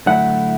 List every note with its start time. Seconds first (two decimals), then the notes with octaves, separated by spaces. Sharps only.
0.06 D3 F#3 A3 E4 F#5